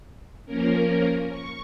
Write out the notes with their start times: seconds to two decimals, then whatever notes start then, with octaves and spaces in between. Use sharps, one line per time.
0.46 F3 A#3 C#4 A#4
1.29 C#6